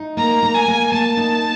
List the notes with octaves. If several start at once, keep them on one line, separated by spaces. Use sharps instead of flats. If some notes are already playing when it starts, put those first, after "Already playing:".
Already playing: D#4
A#3 A#5
A#3
G#5
A#3
A#3 A5
D#4